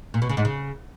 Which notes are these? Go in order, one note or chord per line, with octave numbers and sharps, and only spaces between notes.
A#2
B2
C#3
G#2
C#3